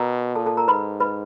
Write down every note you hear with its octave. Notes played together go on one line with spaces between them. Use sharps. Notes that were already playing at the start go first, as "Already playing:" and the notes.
Already playing: B2 A#4 A#5
A#2 A4 A5
A4 A5
A#4 A#5
G#2 B4 B5
B4 B5